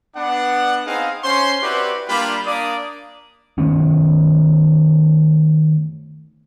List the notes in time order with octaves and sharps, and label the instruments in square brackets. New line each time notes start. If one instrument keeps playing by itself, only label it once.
[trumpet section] B3 D4 F#5
B3 C4 D#4 G#4 F5
C#4 C5 C6
C4 E4 F#4 G4 B4 D5
G3 A#3 D4 F4 G4 B5
A#3 D4 D5 D#6
[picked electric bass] D#3 A3 B3 C#4